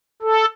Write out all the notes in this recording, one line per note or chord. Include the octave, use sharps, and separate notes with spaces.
A4